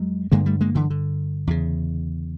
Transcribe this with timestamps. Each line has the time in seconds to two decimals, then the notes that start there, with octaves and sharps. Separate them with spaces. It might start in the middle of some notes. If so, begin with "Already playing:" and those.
Already playing: F2 F#3 G#3
0.32 G2 D3 G#3 A#3
0.46 G3 A3
0.61 G#3 A#3
0.75 D3 E3
0.90 D3
1.47 E2 C#3